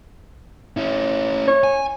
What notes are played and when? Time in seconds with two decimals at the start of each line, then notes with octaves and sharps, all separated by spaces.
0.77 C#4 E4
1.48 C#5
1.64 G#5